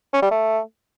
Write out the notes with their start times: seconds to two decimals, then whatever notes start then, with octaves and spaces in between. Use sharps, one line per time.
0.13 C#4
0.22 G3
0.31 A3